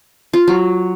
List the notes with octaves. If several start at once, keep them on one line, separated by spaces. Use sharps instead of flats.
F4
F#3